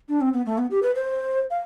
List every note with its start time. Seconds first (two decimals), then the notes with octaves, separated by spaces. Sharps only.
0.09 D4
0.21 C4
0.33 B3
0.46 A3
0.58 B3
0.71 G4
0.83 B4
0.95 C5
1.51 F5